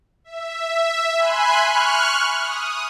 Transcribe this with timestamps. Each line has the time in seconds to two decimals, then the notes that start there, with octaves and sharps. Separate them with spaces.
0.24 E5
1.16 G#5 B5 C6 F#6
1.62 C#6 F6 F#6
2.39 D#6